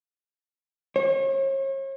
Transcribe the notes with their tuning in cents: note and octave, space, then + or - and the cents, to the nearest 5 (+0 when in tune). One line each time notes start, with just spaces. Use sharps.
C#5 -40